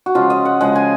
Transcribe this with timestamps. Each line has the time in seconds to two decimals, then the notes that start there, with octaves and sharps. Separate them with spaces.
0.06 F#4
0.15 C#3 F3 G#3 F4
0.30 D#5
0.45 F#5
0.61 C#3 F3 G#3 F#5
0.75 G#5